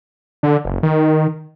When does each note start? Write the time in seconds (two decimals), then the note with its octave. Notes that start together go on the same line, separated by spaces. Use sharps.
0.43 D3
0.65 F#1
0.83 D#3